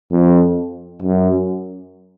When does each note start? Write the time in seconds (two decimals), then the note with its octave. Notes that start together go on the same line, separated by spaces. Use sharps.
0.11 F2
1.02 F#2